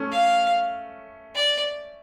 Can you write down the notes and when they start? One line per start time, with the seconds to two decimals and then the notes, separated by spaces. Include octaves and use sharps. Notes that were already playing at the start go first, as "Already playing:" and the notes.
Already playing: A3 C#4
0.12 F5
1.35 D5